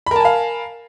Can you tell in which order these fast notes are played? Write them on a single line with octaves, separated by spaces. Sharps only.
B5 A#4 A5 G#5 F5